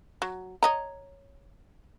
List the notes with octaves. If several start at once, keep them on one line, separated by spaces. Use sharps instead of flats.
F#3
C#5 D#5 A#5